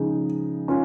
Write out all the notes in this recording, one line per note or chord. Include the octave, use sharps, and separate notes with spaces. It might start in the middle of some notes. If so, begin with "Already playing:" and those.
Already playing: C#3 F3 G#3 D#4
C#4 F4